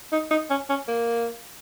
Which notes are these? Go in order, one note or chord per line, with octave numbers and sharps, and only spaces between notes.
D#4
D#4
C#4
C#4
A#3